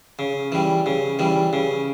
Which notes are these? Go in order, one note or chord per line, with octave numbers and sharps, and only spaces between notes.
C#3
E3 G3
C#3
E3 G3
C#3